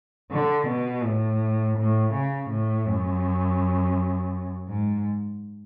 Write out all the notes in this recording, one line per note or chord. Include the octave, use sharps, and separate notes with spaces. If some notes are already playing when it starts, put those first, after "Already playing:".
D3
B2
A2
A2
C#3
A2
F#2
G#2